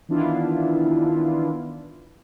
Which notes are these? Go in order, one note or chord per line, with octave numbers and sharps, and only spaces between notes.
D#3 E3 B3 D4 E4 F4